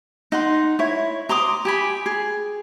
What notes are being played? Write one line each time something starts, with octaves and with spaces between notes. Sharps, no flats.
D#4 F#5 C6
E4 C#5
A#5 C6 D6 D#6
G4 G#5 B5
G#4